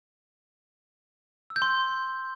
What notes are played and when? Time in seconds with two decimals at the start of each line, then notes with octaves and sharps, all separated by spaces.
1.50 E6
1.56 G6
1.62 C6